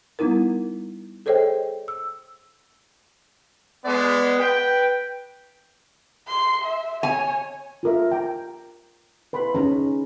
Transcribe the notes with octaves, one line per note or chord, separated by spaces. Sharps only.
G3 B3 D#4 E4 A#4
G#4 A4 C5 C#5 D#5 G5
E6
G#3 B3 D5
B4 G5
C6
E5
C#5 G#5
F4 A#4 E5
G5 A#5
B4 B5 C6
C#4 D#4 G#4 A#5